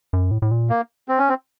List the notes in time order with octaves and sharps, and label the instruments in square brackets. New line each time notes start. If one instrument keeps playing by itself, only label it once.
[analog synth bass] F#2
A2
A2
A#2
[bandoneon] A#3
C4
C#4
C4